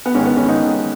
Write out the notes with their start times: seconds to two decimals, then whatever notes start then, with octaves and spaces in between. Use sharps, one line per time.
0.06 B3
0.15 G#2 D#3 C#4
0.25 B3
0.37 C#4
0.48 G#2 D#3 D#4